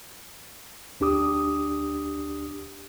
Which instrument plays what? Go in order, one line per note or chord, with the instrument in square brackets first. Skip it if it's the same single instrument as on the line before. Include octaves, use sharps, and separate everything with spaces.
[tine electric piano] D2 D4 G4 D6 D#6